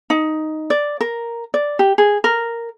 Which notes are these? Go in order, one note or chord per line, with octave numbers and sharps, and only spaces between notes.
D#4
D5
A#4
D5
G4
G#4
A#4